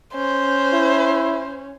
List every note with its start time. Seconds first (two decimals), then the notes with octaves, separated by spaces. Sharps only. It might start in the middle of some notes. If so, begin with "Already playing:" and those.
0.15 C#4 C5
0.73 E4